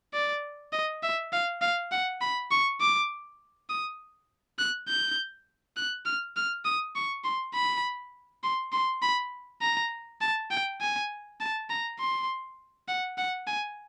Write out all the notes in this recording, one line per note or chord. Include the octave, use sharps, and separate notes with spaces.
D5
D#5
E5
F5
F5
F#5
B5
C#6
D6
D#6
F#6
G6
F#6
F6
F6
D#6
C#6
C6
B5
C6
C6
B5
A#5
A5
G5
G#5
A5
A#5
C6
F#5
F#5
G#5